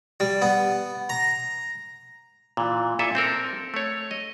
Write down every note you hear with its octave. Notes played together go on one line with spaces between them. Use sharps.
G3
B3
A#5
A#2 E3
A#2 E4 A4 E5 G#5
C4 A4 A#4
A3 C#5
D#5